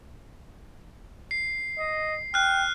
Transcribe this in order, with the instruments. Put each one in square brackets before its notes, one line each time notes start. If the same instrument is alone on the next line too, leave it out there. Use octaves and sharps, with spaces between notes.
[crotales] C7
[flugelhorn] D#5
[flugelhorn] G5 [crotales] F6 F#6